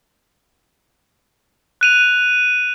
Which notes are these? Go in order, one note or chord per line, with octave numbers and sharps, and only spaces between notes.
F#6 D#7 F7